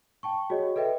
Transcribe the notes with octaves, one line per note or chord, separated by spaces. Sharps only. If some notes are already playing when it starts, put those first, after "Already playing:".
G5 A5 C#6
F#4 G#4 C#5 D#5
A4 B4 D#5 E5 G5